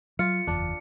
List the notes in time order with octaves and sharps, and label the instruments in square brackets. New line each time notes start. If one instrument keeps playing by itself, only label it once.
[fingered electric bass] F#3 [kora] F4 [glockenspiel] C#7
[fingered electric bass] F#1 E2 [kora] D4